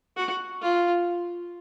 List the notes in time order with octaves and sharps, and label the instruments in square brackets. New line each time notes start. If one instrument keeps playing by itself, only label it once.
[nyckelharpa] F#4
F4